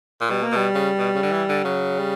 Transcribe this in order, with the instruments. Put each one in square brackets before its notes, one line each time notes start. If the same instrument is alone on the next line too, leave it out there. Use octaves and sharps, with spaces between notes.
[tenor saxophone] A#2
[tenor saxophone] B2 [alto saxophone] G3
[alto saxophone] A#3
[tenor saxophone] B2 [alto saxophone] G3
[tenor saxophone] C#3
B2
C#3
D3
E3
D3
[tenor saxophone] C#3 [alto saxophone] F#3
[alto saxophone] G3